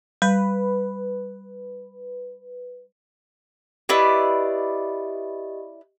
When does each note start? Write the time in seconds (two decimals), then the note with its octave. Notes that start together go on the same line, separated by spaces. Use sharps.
0.22 G3 B4
3.89 E4 G4 B4 D5 D#5